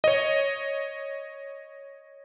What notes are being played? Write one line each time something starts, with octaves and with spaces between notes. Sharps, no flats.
C#5 D#5